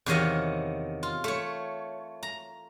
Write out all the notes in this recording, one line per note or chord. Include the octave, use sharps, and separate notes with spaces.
E2 C3 D#3 C#5 D#5 F5
F4
A3 C#5
A#5